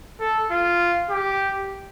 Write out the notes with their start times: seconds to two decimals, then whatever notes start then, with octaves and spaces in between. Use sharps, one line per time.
0.20 A4
0.51 F4
1.10 G4